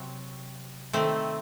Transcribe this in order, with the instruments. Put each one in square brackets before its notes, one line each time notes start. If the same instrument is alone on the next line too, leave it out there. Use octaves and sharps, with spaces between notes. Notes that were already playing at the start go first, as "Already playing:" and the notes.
Already playing: [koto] C3 F#3 C4
D#3 A3 C4